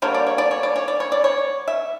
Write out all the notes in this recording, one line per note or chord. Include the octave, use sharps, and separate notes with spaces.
D3 G3 A#3 C#5
D5
C#5
D5
C#5
D5
C#5
D5
C#5
D5
C#5
E5